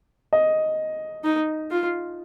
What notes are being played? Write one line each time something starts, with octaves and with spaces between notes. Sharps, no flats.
D#5
D#4
F4